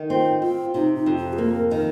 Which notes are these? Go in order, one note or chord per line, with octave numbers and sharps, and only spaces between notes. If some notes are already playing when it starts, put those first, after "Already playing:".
Already playing: D#3
C4 F4
C4 F4
C3 D#4
D#4
F2
F4
G#4
A#3 A#4
D#3 A#4